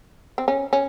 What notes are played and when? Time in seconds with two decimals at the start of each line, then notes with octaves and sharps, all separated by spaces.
0.38 C4
0.48 C#4
0.73 C#4